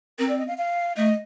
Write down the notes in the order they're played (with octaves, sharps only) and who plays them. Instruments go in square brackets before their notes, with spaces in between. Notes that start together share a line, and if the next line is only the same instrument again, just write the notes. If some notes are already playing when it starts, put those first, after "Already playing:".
[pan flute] C4 [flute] A#4
[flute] D5
D#5
F5
F5
[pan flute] A3 [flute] D#5